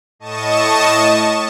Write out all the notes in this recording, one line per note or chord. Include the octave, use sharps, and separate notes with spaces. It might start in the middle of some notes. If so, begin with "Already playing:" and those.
A2 D#5 A5 C#6 D#6 E7